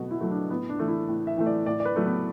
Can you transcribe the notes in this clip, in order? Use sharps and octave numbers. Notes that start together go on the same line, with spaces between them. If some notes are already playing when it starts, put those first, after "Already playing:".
Already playing: B2 F#3 A3 B3 F#4
E4
F#3 A3
D4
A2 B3
D4
E3 A3
E4
A2
E5
E3 A3
D5
A2 D5
D5
B4
F#3 A3
B3